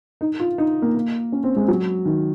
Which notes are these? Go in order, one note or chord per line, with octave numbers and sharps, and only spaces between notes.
D#4
F4
D#4
A#3
A#3
C#4
C4
G#3
F#3
D#3